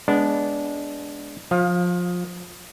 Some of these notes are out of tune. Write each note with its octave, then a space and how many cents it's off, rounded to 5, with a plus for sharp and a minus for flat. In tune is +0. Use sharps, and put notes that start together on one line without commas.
G#3 +0 B3 +0 D4 -15
F3 +25 F5 +10